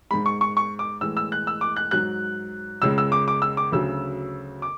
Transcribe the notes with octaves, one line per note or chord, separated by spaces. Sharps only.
G#2 G#3 B5
C#6
C#6
C#6
D6
A2 E3 G#3 E6
E6
F#6
E6
D6
F#6
G#2 F#3 F#6
C#2 C#3 G#3 E6
E6
D6
D6
E6
D6
D2 C#3 F#3 E6
D6